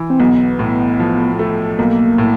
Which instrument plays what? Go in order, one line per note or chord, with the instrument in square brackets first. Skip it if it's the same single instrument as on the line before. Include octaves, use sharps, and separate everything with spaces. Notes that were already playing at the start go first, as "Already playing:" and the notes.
Already playing: [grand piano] E3
[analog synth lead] C4
[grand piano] B1 [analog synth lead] B3
[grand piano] A2
F3
A3
[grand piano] B1 [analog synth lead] A#3
[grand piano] A2